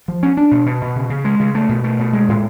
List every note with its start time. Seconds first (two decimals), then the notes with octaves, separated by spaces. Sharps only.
0.08 F3
0.23 C#4
0.37 D4
0.51 B2
0.66 B2
0.82 B2
0.96 C#3
1.10 C#3
1.25 G#3
1.40 C#3
1.55 A3
1.69 B2
1.84 A3
1.99 B2
2.13 G#3
2.28 A2